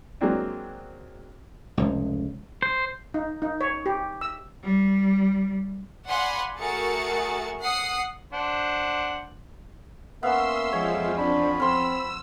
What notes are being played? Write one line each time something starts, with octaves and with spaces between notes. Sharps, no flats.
F#3 G#3 A#3 C4 D4
F1 C#2
C5
D#4
D#4
C#5
G4
E6
G3
D5 F5 F#5 G#5 B5 C6
A3 F#4 G#4 A#4 A6 C#7
F#5 D#6 C7
D4 C5 F#5
A#3 B3 C#4 E5 F5 C6 E6
F2 F3 G#3 C#5
D4 B5
C4 F5 C6 E6